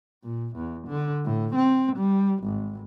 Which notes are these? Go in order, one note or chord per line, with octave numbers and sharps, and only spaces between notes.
A#2
E2
D3
A2
C4
G3
G#1